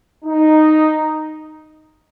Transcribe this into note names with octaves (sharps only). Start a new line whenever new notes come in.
D#4